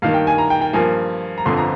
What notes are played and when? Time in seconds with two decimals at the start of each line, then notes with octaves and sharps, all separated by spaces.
0.02 G2 D#3 A#3 F5
0.14 G5
0.27 G#5
0.38 A#5
0.50 G5
0.61 G5
0.73 G2 F3 A#3 G#5
1.38 A#5
1.45 G1 F2 D3 F3 C6
1.57 A#5